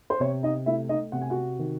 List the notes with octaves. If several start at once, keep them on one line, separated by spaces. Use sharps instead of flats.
C5
C3 C#5
D#4 D#5
A3 E4 E5
D#4 D#5
C3 F#5
G#5
F#4 F#5
D#3